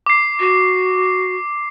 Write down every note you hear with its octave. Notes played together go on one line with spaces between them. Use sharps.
D6 C7
F#4